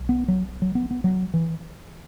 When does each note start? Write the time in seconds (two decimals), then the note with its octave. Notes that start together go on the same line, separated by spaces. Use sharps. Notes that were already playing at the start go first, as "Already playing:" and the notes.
Already playing: B1
0.09 B3
0.28 F#3
0.62 F#3
0.75 B3
0.91 B3
1.04 F#3
1.34 E3